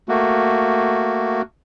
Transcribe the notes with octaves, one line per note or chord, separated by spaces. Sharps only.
A3 A#3 F#4